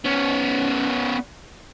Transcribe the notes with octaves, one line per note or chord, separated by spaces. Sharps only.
B3 C#4